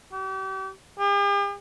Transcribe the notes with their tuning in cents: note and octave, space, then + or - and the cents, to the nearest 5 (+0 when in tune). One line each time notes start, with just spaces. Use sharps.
G4 -40
G4 +45